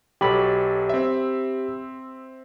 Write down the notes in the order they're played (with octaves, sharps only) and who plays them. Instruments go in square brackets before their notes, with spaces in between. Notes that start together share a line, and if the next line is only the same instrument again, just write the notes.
[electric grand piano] B1 F#3 A4 [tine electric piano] G4 B5
[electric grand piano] C4 E5